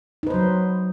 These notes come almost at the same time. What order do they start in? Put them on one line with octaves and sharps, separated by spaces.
D#4 B4 C5 F#3